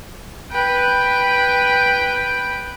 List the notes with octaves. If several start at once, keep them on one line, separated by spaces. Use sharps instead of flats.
B4 G5